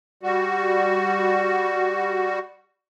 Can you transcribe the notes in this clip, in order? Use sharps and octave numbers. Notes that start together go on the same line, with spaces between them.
G3 F#4